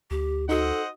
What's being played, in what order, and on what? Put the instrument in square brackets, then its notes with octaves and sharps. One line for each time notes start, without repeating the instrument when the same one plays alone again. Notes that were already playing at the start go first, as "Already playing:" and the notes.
[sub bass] D2 [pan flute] G4
[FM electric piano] D#4 F#4 [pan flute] A4 [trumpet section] C5 D#5 F#5